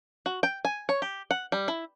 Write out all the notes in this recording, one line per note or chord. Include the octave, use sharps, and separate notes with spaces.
F#4
G5
G#5
C#5
G4
F#5
G3
E4